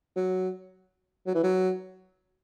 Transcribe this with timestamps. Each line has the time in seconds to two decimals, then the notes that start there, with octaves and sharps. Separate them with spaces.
0.16 F#3
1.27 F#3
1.35 E3
1.43 F#3